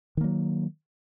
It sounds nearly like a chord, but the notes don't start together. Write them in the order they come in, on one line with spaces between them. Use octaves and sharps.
D#3 A#3 F#3